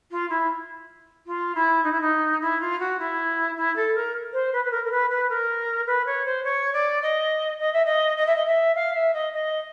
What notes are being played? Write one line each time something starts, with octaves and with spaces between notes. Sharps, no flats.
F4
E4
F4
E4
D#4
E4
D#4
E4
F4
F#4
E4
E4
A4
A#4
C5
B4
B4
A#4
A#4
B4
B4
A#4
B4
C#5
C5
C#5
D5
D#5
D#5
E5
D#5
D#5
E5
D#5
E5
F5
E5
D#5
D#5